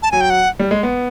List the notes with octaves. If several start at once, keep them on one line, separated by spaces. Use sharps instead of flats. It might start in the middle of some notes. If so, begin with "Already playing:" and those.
A5
F#3 G#5
G5
F#5
G3
G#3
B3